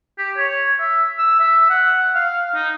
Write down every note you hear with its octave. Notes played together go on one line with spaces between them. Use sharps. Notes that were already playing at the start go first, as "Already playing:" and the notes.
G4
C#5
E5
E6
E5
F#5
F5
D#4